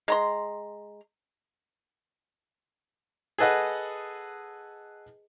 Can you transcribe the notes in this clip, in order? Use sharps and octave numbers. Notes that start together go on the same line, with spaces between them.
G#3 A#5 C6
G#4 A4 B4 D#5 F#5